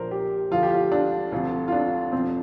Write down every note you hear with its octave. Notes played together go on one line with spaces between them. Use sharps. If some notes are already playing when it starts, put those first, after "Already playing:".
Already playing: A#1 A#2 F3 A#4 C5
G4
D2 D3 F3 F4
G4
F4
D4
D2 C3 F3 F4
F4
D4
F1 F2 C3 F3 C4